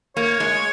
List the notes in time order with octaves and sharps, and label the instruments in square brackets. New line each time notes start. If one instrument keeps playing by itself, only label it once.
[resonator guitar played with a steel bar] A#3 [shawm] C#5
[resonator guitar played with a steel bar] G#3